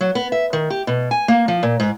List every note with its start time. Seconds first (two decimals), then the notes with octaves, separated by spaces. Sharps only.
0.01 F#3
0.15 B3
0.32 E5
0.53 D#3
0.70 G4
0.87 B2
1.11 G#5
1.28 A#3
1.48 F3
1.63 A#2
1.80 G#2